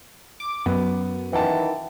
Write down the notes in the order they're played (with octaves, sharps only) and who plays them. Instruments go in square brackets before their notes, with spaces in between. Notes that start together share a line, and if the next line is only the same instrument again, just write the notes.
[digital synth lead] D6
[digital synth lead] F#2 [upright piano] B3
[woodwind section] D#3 E3 [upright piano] F#5 G5 A5